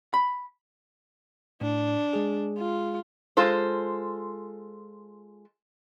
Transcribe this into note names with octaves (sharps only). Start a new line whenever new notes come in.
B5
A2 D4
G#3 G#4
F4
G#3 F4 A4 C5